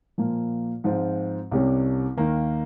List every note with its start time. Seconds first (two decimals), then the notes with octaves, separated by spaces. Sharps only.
0.18 A#2 F3 A#3
0.84 G#2 F3 C4 F4
1.51 C2 C3 G3 C#4
2.17 D#2 D#3 A#3